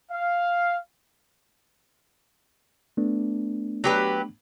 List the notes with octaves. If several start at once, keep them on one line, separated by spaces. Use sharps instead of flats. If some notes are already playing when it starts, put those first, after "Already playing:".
F5
A3 B3 D4
F#3 G4 B4